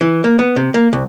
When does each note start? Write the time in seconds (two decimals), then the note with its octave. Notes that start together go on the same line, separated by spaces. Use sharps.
0.01 E3
0.24 A#3
0.39 B3
0.56 C3
0.74 A#3
0.93 C2